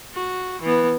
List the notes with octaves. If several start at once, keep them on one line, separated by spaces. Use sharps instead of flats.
F#4
E3 B3